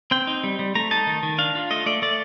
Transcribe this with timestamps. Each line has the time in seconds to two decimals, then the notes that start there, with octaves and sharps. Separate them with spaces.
0.11 C4 G5
0.27 D#4
0.44 G3
0.59 G3
0.75 A3 A#5
0.91 D#4 A5
1.07 D#3
1.23 D#3
1.38 D4 F5
1.55 F4
1.70 A3 D#5
1.86 A3 D5
2.02 A3 D5